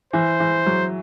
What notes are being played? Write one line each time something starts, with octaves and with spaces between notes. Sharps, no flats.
E3 C5
E3
F#3